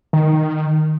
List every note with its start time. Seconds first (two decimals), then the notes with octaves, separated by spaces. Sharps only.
0.13 D#3